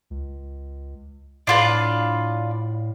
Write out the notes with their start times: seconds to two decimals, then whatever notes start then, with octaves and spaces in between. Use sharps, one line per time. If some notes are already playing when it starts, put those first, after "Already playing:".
0.10 C#2
1.47 A2 D4 F4 B4